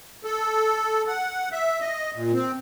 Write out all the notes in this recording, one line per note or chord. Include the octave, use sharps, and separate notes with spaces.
A4
F#5
E5
D#5
A#2
C4